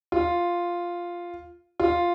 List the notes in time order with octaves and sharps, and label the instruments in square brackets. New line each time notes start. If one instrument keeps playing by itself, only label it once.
[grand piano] F4
F4